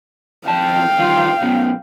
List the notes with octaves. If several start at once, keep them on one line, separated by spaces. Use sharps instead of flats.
F2 F5 G5 A5
D#3 F4
F#2 B2